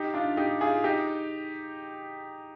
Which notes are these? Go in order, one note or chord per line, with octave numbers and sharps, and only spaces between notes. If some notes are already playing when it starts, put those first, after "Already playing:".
Already playing: D#4 G4
D4 F4
D#4 G4
F4 G#4
D#4 G4